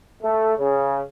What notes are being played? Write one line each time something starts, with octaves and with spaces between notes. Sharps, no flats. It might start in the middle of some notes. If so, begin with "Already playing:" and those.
A3
C#3